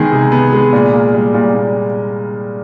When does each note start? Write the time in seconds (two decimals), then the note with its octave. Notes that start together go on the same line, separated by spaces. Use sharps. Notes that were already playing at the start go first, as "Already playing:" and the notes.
Already playing: D#3 G#3 B3 G#4
0.12 C3
0.32 B3
0.53 G#3
0.73 A#2
0.93 A#3
1.14 G3
1.34 A#2
1.55 A#2